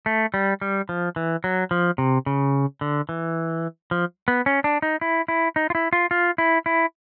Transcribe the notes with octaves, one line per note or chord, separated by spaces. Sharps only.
A3
G3
G3
F3
E3
F#3
F3
C3
C#3
D3
E3
F3
B3
C#4
D4
D#4
E4
E4
D#4
F4
E4
F4
F4
E4
E4